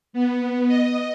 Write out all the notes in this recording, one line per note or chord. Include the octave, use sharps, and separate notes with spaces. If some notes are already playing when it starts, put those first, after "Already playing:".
B3
D#5